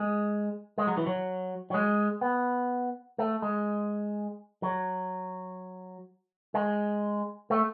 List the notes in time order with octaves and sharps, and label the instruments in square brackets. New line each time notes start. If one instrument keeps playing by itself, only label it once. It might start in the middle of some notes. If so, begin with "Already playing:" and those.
Already playing: [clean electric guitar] G#3
G#3
F#3
E3
F#3
F#3
G#3
B3
A3
G#3
F#3
G#3
A3